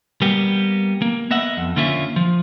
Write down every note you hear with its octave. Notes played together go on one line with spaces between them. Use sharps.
G3 A#3 B3 G4
A#3
B3 D#5 E5 F#5
F2
D3 A#3 C#4 F4 A#4 E5
F3